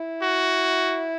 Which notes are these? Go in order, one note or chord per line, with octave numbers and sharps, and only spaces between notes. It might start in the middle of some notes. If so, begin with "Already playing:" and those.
Already playing: E4
F#4